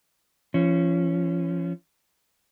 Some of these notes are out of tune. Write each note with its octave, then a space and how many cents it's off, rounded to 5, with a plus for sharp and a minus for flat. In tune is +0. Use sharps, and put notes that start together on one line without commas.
F3 -35 C#4 +0